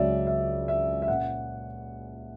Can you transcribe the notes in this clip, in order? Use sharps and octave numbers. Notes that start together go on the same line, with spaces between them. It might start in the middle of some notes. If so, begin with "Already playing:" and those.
Already playing: C#2 C#3 F#3 C#4 D5 E5
E5
E5
E5
A#2 A#3 C#4 F#5